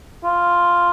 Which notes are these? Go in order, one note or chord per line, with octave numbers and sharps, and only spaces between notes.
F4